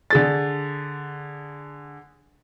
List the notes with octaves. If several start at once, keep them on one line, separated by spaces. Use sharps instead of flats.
D3 G#4 A6